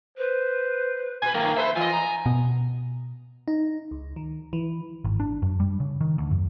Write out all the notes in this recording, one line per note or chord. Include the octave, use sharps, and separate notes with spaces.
B4 C5
A#2 B4 G#5
G2 D#3 A3 A#3
A4 B4 C5 E5
E3 F4 D#5 G#5
A#5
B2
D#4
C#2
D#3
E3
G#1
D4
F#2
G3
C#3
D#3
D2
F#2